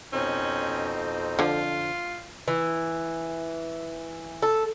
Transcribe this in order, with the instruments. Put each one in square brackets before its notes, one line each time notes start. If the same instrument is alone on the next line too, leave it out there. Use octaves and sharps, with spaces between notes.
[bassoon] F2 [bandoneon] B2 C4 D#4 [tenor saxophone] C#4
[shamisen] D3 F3 [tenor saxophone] F4
[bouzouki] E3
A4